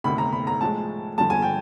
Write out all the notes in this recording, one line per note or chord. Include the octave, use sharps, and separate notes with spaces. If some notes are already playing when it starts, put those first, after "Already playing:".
D2 C3 D#3 B5
A#5
B5
A#5
A2 F3 G#3 A5
G2 D3 F3 A5
G#5
G5